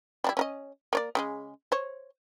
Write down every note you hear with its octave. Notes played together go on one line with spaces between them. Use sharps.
G3 D4 E4
C#4 A#4 D#5
A#3 C#5 D5
C#3 G3 G#3
C5 C#5